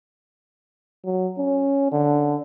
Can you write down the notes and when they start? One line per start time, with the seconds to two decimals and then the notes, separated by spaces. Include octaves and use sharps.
1.05 F#3
1.38 C#4
1.92 D3